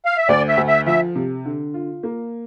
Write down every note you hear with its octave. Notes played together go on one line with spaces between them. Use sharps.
F5
E5
D2 D5
E5
D2
E5
F3 E5
C3
D3
F4
A#3